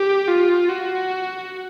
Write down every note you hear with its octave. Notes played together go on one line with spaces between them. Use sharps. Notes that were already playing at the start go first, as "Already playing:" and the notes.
Already playing: G4
F4
F#4